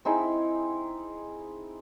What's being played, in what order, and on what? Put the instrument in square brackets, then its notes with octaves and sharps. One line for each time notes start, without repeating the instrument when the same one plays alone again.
[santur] C4 D#4 E4 G#4